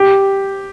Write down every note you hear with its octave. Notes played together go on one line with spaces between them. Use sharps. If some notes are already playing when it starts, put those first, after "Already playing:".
Already playing: G4